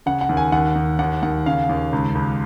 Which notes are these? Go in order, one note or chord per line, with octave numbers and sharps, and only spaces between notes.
C#3 F#5
F#5
D#2
G#5
D#2 F#5
D#2
D#2 F#5
D#2 F#5
C#3 F5
D#2
C#2
C#2